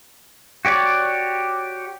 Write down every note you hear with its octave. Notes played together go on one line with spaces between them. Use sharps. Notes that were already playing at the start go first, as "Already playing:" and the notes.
F#4 G4 C#5 D5